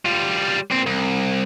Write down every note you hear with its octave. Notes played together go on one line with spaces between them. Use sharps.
G3 F4
A#2 C4
C2